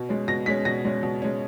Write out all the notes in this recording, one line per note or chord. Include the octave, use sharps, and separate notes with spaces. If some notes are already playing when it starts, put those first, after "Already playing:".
Already playing: B2
G#3 C#4
B2 A#6
G#3 C#4 B6
B2 A#6
G#3 C#4
B2
G#3 C#4